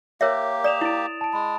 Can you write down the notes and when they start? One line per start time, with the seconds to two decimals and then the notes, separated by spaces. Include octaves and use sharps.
0.21 A#3 G4 A#4 C#5 E5
0.64 D5 D#6 E7 F7
0.81 E4 A6 D7
1.21 A5 D7
1.33 G#3 B5